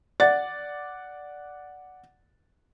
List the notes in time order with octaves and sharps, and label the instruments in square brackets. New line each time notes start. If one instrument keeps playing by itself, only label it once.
[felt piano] D5 F#5 A6